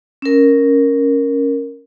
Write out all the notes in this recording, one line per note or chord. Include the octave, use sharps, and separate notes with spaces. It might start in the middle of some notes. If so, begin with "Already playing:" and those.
C#4 A#4